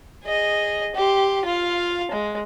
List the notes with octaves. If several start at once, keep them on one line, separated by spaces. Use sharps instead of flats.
G#4 D#5
G4 C6
F4 F5
G#3